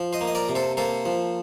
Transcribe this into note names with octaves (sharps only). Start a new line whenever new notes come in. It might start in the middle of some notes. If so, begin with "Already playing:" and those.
Already playing: F3
C5 D#5
A#3
D#5
A#4 D5
C3
A4 C5
A#3 A4 C5
F3